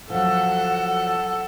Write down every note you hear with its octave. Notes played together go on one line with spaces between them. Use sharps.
F3 F#3 A4 F#5